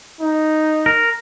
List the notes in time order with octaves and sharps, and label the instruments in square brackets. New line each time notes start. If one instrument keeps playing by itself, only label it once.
[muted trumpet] D#4
[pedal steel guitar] A#4